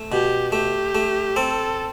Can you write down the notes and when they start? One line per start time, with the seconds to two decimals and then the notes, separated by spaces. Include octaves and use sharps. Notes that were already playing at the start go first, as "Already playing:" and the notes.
Already playing: A3
0.12 B2 G4
0.52 A3 G4
0.95 A3
1.36 C4 A4